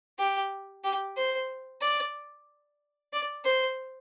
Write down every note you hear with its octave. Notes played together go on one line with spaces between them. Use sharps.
G4
G4
C5
D5
D5
C5